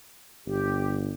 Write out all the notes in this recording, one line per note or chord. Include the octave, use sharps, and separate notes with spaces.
G1 G4